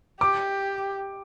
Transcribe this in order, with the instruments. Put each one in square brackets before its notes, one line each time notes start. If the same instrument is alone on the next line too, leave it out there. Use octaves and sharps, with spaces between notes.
[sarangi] G4 [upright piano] D6